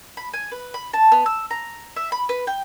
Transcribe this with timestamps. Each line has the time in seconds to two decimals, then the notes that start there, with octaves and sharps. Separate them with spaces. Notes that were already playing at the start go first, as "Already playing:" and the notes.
0.17 B5
0.34 G#5
0.52 B4
0.74 B5
0.93 A5
1.12 B3
1.26 E6
1.51 A#5
1.96 E5
2.12 B5
2.29 B4
2.47 G5